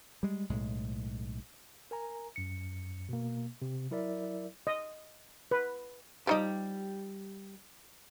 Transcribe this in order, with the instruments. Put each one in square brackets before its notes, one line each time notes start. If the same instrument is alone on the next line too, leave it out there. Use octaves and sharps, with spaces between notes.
[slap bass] G3 G#3
B1 A2 G#3
[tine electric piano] A#4 G#5 A#5
F#2 C#7
B2 A#3
C3
F#3 E4 A#4 D5 E5
[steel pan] D#5
B4
[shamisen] F3 D#4 D#5 [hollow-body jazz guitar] G3 G4